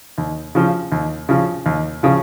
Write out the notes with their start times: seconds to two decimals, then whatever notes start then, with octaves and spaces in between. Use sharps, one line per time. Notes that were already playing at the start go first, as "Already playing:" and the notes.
0.18 D#2
0.55 C#3 F3
0.92 D#2
1.29 C#3 F3
1.66 D#2
2.03 C#3 F3